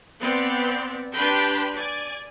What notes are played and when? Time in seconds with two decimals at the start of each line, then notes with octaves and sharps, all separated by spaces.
0.21 B3 C4 D5
1.15 D4 G4 B4 G5 B5 C6
1.74 D5 G#5